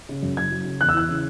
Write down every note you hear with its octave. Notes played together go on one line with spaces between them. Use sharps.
C#3
F#2
F#1 G#6
F#3
C#3
E2 F#6
E6
E3 F#6
C#3